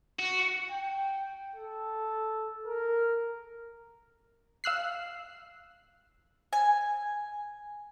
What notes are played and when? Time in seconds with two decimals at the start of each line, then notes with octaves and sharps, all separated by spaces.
0.19 F#4
0.71 G5
1.56 A4
2.66 A#4
4.64 F5 E6 F#6 C7
6.53 G#5